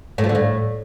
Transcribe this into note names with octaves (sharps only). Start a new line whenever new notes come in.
A2
F3
D3
A2